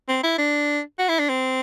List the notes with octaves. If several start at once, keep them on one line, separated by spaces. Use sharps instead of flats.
C4
E4
D4
F#4
E4
D4
C4